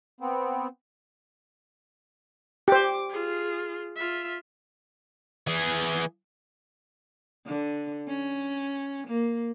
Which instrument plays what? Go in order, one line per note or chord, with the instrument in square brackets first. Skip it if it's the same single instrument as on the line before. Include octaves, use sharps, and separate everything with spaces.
[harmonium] B3 C4
[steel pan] G4 C5 [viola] D6
[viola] F4 G#4
F4 E5
[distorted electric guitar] E3 G#4
[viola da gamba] D3
C#4
A#3